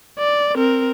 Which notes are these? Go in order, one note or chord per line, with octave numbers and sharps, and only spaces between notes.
D5
C4 A#4